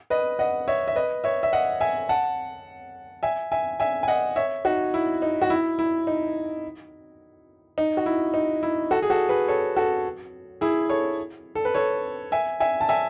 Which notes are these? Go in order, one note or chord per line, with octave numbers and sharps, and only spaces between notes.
B4 D#5
D#5 F#5
C#5 E5
E5
B4 D#5
C#5 E5
E5
D#5 F#5
E5 G#5
F#5 A5
E5 G#5
E5 G#5
E5 G#5
G#5
D#5 F#5
C#5 E5
D#4 F#4
E4
D#4
F#4
E4
E4
D#4
D#4
F#4
E4
D#4
E4
F#4 A4
G#4
F#4 A4
G#4 B4
A4 C#5
F#4 A4
E4 G#4
A4 C#5
A4
B4
A4 C#5
E5 G#5
E5 G#5
A5
E5 G#5